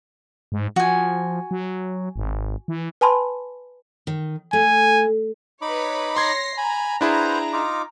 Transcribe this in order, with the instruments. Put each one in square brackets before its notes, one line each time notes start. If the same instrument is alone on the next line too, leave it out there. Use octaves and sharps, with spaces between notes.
[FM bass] G#2
[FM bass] F3 [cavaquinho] F#4 G#5
[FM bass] F#3
G#1
E3
[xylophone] B4 G#5 A5 B5 C6
[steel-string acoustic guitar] D#3
[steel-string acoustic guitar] A3 [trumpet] G#5
[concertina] D#4 B5 D6 [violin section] B4 C#5
[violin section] C#5 A#6 C7 [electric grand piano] C6 G#6
[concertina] G#5 B5 [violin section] A#5
[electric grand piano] D4 E4 G#4 [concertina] B4 C5 F#5 [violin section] A#5
[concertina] D#4 F4 D6